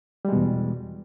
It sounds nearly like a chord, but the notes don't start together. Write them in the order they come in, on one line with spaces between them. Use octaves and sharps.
G3 G#3 B2 E2